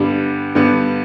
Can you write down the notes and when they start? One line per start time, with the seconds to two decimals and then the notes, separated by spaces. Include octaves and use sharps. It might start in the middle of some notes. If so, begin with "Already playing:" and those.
Already playing: G2 D3 G3 B3
0.55 G2 D3 G3 B3